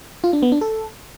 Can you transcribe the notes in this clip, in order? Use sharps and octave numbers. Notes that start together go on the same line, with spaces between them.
F4
D4
B3
D4
A4